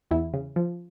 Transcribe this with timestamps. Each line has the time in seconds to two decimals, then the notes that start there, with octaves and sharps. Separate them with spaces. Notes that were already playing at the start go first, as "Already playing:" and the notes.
0.11 E2 E4
0.34 C#3
0.56 F3